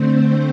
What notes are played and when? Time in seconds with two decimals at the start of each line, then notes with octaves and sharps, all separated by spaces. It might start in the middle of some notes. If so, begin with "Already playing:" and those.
Already playing: D3 A3 C4 C5
0.16 C5